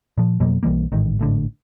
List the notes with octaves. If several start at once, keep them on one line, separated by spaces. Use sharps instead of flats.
A#2 F3
F2 B2 F#3 A#3
B1 E3 G3 A#3
A1 G#2 D#3
G#1 A2 D3